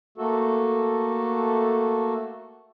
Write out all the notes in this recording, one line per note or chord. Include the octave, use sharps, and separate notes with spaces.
A3 A#3 F#4 A4